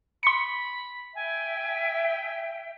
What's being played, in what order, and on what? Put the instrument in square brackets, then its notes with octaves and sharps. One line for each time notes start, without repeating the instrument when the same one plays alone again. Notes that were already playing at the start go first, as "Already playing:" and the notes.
[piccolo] B5 [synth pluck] C6 C#7
[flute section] E5 G5 [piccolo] G#5